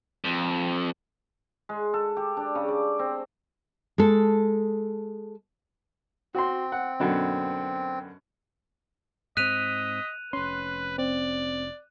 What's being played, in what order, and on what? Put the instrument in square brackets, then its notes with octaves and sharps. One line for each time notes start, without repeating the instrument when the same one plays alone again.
[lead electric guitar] F2
[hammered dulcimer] G#3
A4
G4
D4
C#3
D5
C4
[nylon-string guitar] G#3 A4
[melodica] C4 [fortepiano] F#4 C6
[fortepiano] F#5
F#2 B2 D3
[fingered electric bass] G#2 C4 [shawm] D#5 [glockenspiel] F#6 D#7 F7 [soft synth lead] B6
[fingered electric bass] F1 C#4 [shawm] B4 [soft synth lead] C6
[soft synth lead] C4 [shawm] D5